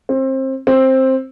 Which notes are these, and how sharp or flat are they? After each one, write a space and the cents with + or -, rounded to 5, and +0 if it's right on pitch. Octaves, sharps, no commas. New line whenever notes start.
C4 +25
C4 +10